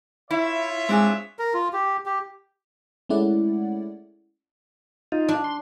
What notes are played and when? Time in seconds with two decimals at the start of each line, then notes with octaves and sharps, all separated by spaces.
0.31 E4 F4 C#5 E5
0.89 G#3 C4 D4 G#4
1.39 A#4
1.54 F4
1.73 G4
2.06 G4
3.09 G#3 A3 C#4 E4 D5 F#5
5.12 D#4 F4
5.28 D4
5.44 C6